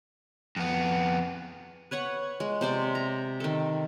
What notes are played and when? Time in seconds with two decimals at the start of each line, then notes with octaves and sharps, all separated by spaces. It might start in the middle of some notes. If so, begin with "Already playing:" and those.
0.56 F2 B3
1.91 B4 C#5 F#5 C#6
2.40 G#3
2.61 C3 C5 D5
2.95 A#5
3.40 D#3 A4